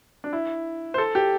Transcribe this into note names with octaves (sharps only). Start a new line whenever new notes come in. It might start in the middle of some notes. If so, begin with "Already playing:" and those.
D4
E4
C5
A4
G4